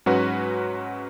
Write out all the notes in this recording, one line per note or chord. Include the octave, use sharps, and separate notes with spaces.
G#2 F#3 C#4 F#4 B4